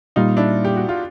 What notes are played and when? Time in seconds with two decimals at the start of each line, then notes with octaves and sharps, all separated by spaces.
0.16 A#2 G3 A#3 D#4 F4
0.37 D4 E4
0.64 G4
0.76 F#4
0.89 F4